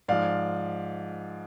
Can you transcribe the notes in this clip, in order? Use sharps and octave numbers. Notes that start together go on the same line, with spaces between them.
G#2 F3 D5 F5